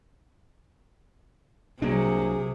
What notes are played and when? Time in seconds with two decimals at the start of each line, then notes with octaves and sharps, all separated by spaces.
1.82 C2 C3 F#3 A#3 D4 G#4